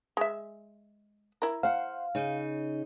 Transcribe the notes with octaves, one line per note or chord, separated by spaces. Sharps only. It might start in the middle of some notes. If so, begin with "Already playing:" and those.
G#3 E5
E4 A#4
C5 F5 F#5
C#3 D#4